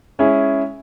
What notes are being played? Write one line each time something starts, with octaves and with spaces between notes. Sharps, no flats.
G#3 C#4 E4 G#4